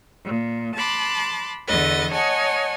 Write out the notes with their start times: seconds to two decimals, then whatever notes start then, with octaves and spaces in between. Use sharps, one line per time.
0.24 A#2
0.76 A5 B5 C6 D6 F#6
1.67 E2 D3 B4 D#5 A6
2.11 C#5 D#5 F#5 G#5 A5